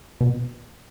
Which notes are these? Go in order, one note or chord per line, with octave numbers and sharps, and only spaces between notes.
B2